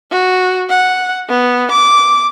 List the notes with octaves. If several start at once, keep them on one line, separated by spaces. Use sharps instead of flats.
F#4
F#5
B3
D6